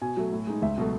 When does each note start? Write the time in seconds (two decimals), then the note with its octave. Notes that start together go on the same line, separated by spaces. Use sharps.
0.02 B2 G#5
0.17 F#3 A3
0.32 A2
0.47 G#3 D#4
0.62 C#2 E5
0.78 B2 F#3 A3